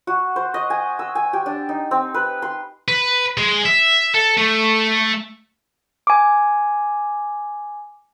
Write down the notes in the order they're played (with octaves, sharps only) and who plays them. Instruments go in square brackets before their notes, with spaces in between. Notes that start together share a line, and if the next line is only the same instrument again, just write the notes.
[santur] F#4
C5
D#5
G#5
E6
G#5
G4
D4
D#4
C4
B4
C6
[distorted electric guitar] B4
G#3
E5
A4
A3
[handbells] G#5 D6